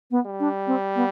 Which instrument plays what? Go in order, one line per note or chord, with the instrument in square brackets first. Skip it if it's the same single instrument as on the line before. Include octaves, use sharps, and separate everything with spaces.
[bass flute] B3
[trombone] G3
[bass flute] D4
C4
B3